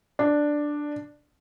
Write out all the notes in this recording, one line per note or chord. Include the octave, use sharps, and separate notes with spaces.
D4